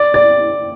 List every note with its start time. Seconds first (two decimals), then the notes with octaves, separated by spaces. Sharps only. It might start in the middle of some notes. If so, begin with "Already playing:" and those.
Already playing: D5
0.14 D5